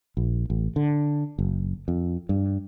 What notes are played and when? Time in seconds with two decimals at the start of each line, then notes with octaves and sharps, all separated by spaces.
0.17 A#1
0.50 A1
0.76 D3
1.39 F#1
1.88 F2
2.29 G2